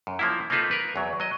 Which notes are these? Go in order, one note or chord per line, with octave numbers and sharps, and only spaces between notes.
F#2
F3 A#3 E4
A#3 C4 D#4 F4 A4 B4
A#4 B4
E2 F#3
F#3 D#5